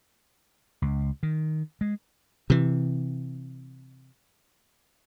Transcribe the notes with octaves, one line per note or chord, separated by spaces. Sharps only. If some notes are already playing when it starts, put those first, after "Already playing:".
C#2
D#3
G#3
C3 E3